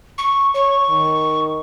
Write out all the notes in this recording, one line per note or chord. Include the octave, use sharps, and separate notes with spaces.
C#6
C#5 C#6
D#3